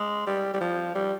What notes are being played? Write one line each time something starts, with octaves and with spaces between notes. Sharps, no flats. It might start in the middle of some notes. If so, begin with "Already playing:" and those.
Already playing: G#3
G3
G3
F3
G3